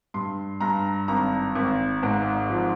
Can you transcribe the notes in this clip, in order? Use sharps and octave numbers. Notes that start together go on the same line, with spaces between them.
G2 C6
G2 A#5
G#1 A#5
G#1
G#2
F3